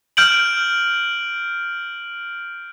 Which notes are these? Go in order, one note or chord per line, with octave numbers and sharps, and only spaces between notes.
F6 G6 D7 F#7